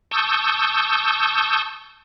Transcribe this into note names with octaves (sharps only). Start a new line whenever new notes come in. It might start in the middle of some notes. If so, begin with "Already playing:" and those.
A5 C#6 D#6 E6 G6